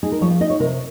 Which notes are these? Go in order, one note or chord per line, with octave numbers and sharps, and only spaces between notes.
D#4 G#4
A#4
F3 C#5
F5
D#4 D#5
C#5
C3 A#4